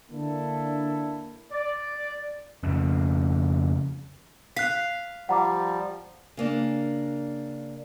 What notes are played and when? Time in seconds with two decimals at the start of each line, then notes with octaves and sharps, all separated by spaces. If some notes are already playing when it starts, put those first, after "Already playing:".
0.10 D3 A#3 D4 E4 A4
1.52 D5
2.63 F2 C#3
4.56 F5 F#6 B6
5.29 F3 G3 F#5 A#5 D6
6.37 C#3 A#3 D4